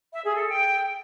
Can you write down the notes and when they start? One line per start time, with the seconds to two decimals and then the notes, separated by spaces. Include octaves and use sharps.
0.14 E5
0.25 G#4
0.37 A4
0.48 G5